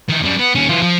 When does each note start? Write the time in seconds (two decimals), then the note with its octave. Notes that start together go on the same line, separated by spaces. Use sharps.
0.09 D#3 E3
0.22 F#2 G3
0.39 B3
0.55 D#2 C#4
0.69 E3 F4
0.83 F3